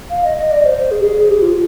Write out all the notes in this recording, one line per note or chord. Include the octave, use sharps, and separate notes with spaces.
F5
D#5
D#5
D5
C5
C5
G#4
G4
G#4
G#4
G4
F4